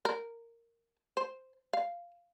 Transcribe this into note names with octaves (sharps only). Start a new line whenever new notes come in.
A#4
C5
F5